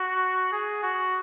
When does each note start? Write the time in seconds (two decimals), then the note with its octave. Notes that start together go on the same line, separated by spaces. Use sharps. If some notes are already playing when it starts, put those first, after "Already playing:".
Already playing: F#4
0.52 G#4
0.83 F#4